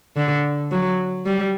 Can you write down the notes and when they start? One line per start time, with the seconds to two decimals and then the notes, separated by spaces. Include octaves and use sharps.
0.17 D3
0.71 F#3
1.26 G3